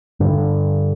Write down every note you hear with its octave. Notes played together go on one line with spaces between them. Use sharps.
G2 D3